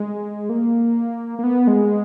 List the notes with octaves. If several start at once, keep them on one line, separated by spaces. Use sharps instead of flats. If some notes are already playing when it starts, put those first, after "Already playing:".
Already playing: G#3
A#3
A#3
B3
G#3